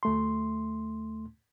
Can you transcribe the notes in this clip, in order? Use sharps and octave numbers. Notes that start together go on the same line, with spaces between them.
D2 A3 C6